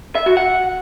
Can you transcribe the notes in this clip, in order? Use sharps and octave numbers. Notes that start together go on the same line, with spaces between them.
E5
F#4
F#5